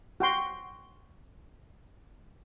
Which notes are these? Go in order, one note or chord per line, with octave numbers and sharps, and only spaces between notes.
F#4 G5 C6